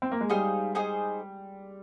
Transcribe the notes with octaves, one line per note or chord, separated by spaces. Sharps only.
C4
A#3
G#3
G3 D#4 G#4 C5 F5
D#4 G#4 C5